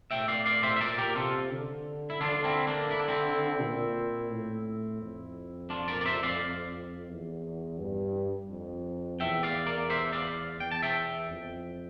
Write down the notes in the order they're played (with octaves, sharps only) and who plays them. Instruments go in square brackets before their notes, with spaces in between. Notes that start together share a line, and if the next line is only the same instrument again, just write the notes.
[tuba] A2 [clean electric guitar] E5 G5
[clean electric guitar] D5 F5
D5 F5
C5 E5
E5
[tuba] A#2 [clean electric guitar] A#4 D5
[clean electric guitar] G4 A#4
[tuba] C3 [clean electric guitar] F4 A4
[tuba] D3
[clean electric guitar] E4
[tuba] D3 [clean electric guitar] D4 F4
[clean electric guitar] C4 E4
A#3 D4
E4
D4
C4 E4
[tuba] A#2
A2
F2
[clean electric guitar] D4 F4
A#4 D5
D5
C5 E5
D5 F5
[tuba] E2
G2
F2
[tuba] E2 [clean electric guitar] E5 G5
[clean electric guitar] D5 F5
A#4 D5
C5 E5
D5 F5
[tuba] E2 [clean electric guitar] G5
[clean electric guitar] A5
E5 G5
[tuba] F2